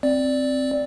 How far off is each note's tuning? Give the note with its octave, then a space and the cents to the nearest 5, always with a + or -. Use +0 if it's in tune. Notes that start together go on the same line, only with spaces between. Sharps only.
C4 +0 D5 +0